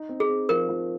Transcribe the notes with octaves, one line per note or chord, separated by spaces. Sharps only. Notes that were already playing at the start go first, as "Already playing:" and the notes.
Already playing: D#4
C4
G#4
C4
F3 A#4
F3